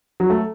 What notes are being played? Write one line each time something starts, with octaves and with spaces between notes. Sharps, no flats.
F#3
A3